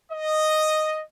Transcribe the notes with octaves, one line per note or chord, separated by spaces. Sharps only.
D#5